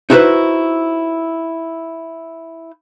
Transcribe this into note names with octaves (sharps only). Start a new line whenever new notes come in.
D#4 E4 F#4 A4 B4 C5